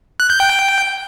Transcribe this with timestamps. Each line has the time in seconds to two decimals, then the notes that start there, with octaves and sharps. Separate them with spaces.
0.20 F#6
0.30 G6
0.40 G5